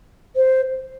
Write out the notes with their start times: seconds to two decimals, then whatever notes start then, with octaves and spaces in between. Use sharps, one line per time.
0.36 C5